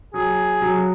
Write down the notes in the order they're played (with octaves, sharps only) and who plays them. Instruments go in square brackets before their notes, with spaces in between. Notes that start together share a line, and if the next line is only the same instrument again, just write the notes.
[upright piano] F#3 [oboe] G#4
[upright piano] F#3